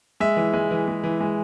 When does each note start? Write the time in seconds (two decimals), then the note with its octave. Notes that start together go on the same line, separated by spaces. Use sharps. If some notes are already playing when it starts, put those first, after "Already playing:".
0.20 G#3 E5
0.37 E3
0.53 G#3
0.71 E3
0.88 G#3
1.04 E3
1.21 G#3